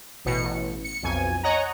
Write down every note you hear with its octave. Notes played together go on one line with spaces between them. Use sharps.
A1 B2 C#7
A1
C#7
B1 F2 G#5
C#5 D#5 F#5 A#5